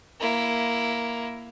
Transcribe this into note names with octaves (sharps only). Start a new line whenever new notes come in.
A#3 E4